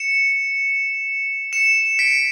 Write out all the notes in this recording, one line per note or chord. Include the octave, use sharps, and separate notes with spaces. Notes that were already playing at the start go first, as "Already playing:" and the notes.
Already playing: C#7 E7
C#7 E7
B6 D7